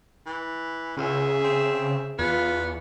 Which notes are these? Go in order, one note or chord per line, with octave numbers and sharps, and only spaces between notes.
E3
C#2 C#3 G#4 E5
C4
E2 B3 F4